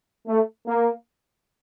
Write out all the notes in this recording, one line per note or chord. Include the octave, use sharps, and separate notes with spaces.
A3
A#3